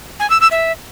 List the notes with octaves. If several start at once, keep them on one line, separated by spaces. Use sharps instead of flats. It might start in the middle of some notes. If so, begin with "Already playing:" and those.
G#5
E6
E6
E5